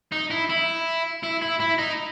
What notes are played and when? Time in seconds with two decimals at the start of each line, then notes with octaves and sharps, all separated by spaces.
0.12 D#4
0.30 E4
0.49 E4
1.24 E4
1.42 E4
1.60 E4
1.78 D#4